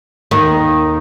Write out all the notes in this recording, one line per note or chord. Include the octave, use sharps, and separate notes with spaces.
D#2 D#3